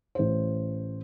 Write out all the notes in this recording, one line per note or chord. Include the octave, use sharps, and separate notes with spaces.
A1 C5